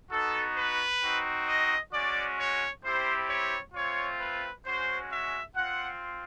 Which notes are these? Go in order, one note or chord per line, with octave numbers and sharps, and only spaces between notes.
B3 D#4 F#4 A4
B4
C4 D#4 F#4
D#5
G#3 C#4 F#4 D5
C#5
G3 C4 E4 G4 C5
C#5
A3 C4 F4 C#5
B4
G#3 C#4 F#4 C5
E5
C4 F4 F#5